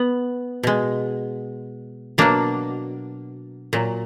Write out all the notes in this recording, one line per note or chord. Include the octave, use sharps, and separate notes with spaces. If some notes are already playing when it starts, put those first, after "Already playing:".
Already playing: B3
B2 G#3
B2 F#3 A#3 D4
A#2 F#3